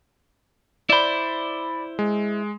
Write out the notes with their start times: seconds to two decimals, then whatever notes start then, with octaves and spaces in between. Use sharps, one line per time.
0.90 E4 C5 D5 B5
1.99 G#3